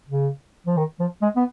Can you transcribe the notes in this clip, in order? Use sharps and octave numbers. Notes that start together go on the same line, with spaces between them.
C#3
F3
D#3
F3
G#3
B3